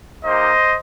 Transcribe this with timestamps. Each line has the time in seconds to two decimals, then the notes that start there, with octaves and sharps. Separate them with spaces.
0.24 A#3 D#4 G4 C5 D#5